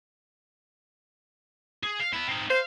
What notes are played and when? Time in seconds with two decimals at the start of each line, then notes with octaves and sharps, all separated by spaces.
1.83 G#4
2.00 F5
2.13 B3 E4
2.28 C4 D#4
2.50 C5 F5